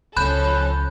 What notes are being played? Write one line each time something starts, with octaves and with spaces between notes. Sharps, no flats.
C#2 F3 C#4 A4 B5 F#6 G6